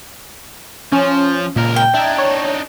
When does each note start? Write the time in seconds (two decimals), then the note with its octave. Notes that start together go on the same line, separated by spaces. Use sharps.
0.92 F3 C#4
1.56 C#2 A#2 A#4
1.76 G5
1.94 D4 D#4 E5 G#6
2.18 C#5